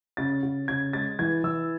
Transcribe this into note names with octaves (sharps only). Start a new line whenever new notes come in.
C#3 A6
C#3
C#3 G#6
G#3 A6
E3 G#6
E3 E6